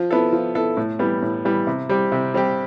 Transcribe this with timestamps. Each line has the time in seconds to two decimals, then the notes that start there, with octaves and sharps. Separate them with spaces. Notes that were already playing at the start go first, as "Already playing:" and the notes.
Already playing: F3
0.11 B3 E4 A4
0.33 F3
0.55 B3 E4 A4
0.77 A2
0.99 E3 G3 B3
1.22 A2
1.45 E3 G3 B3
1.67 C3
1.89 G3 C4 G4
2.12 C3
2.34 G3 C4 G4